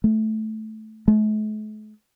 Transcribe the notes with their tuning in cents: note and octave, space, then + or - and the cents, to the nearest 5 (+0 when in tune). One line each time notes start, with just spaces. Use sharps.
A3 -10
A3 -45